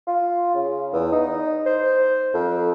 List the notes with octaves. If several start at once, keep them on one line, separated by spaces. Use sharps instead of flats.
F4
C#3
E2
D#4
C5
F2